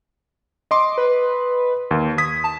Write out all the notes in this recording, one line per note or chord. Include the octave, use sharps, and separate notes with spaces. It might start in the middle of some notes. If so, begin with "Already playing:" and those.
D#5 C6 D6
B4
D#2
D#6 G#6 B6
A5